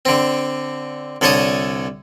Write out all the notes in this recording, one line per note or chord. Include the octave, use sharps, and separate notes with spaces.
D3 C4
C2 D3 A4 C#5 C#6 D#6